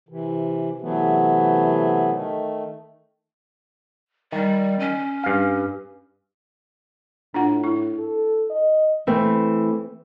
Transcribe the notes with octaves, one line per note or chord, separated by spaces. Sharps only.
C3 E3
C3 E3 F#3 A3 B3
D#3 A3
D#3 G3
C#4
G2 F5
A2 D4 F4 F#5
E4
A4
D#5
E3 A3 C4